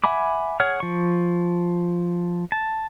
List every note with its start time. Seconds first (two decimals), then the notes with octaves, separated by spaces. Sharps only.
0.04 E5 F#5 G#5 B5 D6
0.60 G#4 C#5 F#5 F6
0.80 F3 C#6
2.52 A5